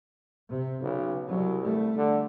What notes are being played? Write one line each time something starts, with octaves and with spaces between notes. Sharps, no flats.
C3
B1 C#3
C2 F#3
G3 A3
D3